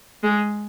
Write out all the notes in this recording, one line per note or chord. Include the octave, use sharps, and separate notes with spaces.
G#3